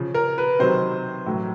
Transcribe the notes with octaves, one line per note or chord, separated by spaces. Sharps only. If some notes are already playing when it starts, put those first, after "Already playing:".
Already playing: C#3 F3
A#4
B4
C3 D#3 F#3 C5
A2 F#3